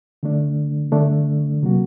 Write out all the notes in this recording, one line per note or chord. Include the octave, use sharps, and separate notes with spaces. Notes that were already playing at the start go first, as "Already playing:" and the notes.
D3 A3 D4
D3 A3 D4
C3 F#3 A#3 F#4